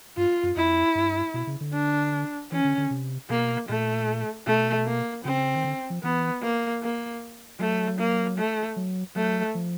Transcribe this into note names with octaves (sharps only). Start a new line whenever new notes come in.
G2 F4
F#2
F2 E4
G2
B2
C#3
D3
D4
E3 C#4
D3
D3
C3
B2 A#3
A#2 A3
B2 A3
A#3
C#3 C4
D#3
D3
F3
E3 B3
A#3
A#3
F#3 A3
A#3
A3
F#3
F#3 A3
F3